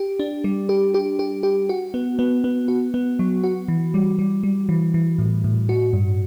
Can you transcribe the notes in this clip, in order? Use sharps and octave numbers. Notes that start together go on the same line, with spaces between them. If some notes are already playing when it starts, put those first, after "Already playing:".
Already playing: G4
D4
G3
G4
G4
G4
G4
F#4
B3
B3
B3
F#4
B3
F#3
F#4
E3
G3
G3
G3
E3
E3
A2
A2
F#4
G2